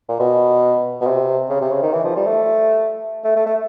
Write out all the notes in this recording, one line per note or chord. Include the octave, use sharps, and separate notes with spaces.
A#2
B2
B2
C3
C#3
C3
C#3
D#3
E3
F3
G3
A3
A3
A3
A3